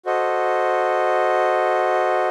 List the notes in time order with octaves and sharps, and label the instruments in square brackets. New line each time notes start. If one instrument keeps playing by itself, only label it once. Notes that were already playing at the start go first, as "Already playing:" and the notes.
[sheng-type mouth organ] F#4 A4 C5 D#5